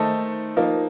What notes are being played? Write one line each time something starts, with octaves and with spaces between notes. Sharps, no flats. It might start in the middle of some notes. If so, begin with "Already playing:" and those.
Already playing: D#3 A3 D#4 A4 C5
F3 A#3 D#4